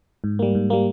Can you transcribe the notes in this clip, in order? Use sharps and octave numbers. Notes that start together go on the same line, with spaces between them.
G#2
G3 A#3
G#2
G3 A#3